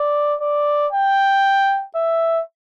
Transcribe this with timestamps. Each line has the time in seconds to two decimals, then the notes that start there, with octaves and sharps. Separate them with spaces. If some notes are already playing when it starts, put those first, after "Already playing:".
Already playing: D5
0.41 D5
0.93 G5
1.95 E5